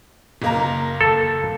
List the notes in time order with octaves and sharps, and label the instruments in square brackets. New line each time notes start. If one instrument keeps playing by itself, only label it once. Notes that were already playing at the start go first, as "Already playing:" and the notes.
[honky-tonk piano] F#1 A#3 A#5
[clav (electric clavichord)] A4